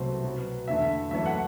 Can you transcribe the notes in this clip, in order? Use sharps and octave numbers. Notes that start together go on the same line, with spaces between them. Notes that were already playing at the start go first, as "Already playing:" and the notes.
Already playing: C2 B2 F#3 A3 C5
B2 F#3 B3
E2 D3 A3 E5
F#2 E3 A3 E5
F#5